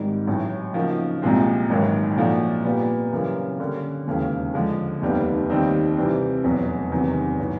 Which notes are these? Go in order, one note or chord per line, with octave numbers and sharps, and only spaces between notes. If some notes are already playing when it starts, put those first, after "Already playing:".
Already playing: G#1 G#2 D#3 G3
A1 A2 F#3
C#3 F3 A#3 D#4 F#4
C2 A#2 F3 G#3 C4
A1 G#2 D#3 F#3 A#3
A#2 F3 A3 D4 F#4
A#2 G3 B3
F#2 C#3 E3 G3 A#3
D3 G3 A#3 C#4
E1 D#2 C#3 E3 A3
D3 F3 G#3
F1 D#2 D#3 G3 B3
D#2 D#3 G3 C4 D#4
C3 E3 G3 C4
F1 E2 B2 F#3
F#1 E2 C3 D#3 F#3
A2 F#3 B3